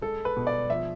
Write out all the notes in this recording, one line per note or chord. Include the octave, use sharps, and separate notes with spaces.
G#3 A4
B4
B2
D5
F3 E5